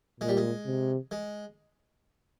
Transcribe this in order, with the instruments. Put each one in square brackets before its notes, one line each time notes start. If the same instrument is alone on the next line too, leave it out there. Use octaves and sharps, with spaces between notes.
[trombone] A#2 [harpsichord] G#3
[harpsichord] G3
G#3
[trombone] C3
[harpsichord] G#3